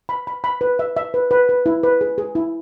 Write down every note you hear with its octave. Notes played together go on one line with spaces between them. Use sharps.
B5
B5
B5
B4
E5
E5
B4
B4
B4
E4
B4
G#4
G#4
E4